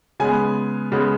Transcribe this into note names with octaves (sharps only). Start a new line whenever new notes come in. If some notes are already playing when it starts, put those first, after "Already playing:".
C#3 G#3 B3 G#5
C#3 G#3 B3